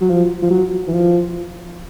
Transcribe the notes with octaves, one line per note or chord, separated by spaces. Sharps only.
F#3
F3
F3
F#3
E3
F3